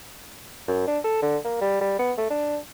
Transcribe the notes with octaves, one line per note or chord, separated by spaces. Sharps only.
F#2
D4
A4
D3
A#3
G3
G3
B3
A3
D4